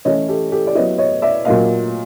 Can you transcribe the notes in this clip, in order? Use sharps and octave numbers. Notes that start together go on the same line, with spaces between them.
E3 A3 C#4 E4 C#5 D#5
G4 A4
G4 A4
D5
F#3 B3 E4 C#5 D#5
C#5 D#5
D5 E5
A#2 F#3 A#3 D#5 F5